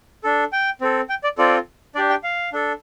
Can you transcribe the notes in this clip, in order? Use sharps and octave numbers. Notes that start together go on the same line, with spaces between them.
D4 A4
G5
C4 A4
G5
D5
C4 F4 A4 D5
D4 G4 D5
G5
F5
D4 A4